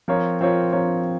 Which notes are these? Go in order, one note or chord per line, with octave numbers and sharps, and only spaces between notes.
F3 C4 F4 A#4 C#5
F3 C4 F4 A#4 C#5
F3 C4 F4 A#4 C#5